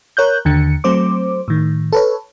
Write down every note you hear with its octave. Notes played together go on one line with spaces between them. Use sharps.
A#4 C#5 F#6 G6
D#2 D3 C#7
F#3 A3 C4 C5 D6
A2 D#3
A4 B4 C#5